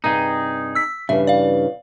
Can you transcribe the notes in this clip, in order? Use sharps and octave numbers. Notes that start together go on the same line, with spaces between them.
G2 C3 D#4 G#4
E6 B6
G2 C#3 E3 E5
D5 F5